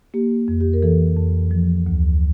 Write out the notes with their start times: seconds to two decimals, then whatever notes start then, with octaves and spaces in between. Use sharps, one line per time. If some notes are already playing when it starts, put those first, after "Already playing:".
0.14 A#3 G4
0.48 F2
0.61 G4
0.73 A#4
0.82 E3 A4
1.17 F2
1.51 F3
1.86 D2